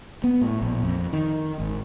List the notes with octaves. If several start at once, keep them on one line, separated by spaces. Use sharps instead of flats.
B3
A2
A#1
F2
D#3
G#1